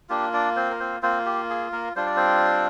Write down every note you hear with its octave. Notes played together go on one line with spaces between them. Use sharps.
A#3 D4 F4 G4
D4 D5
C4 C5
A#4
C4 C5
A#3 C4 F4 C5
G4
G#4
A#3 A#4
G3 D4 F4 C5
D5
C4 C5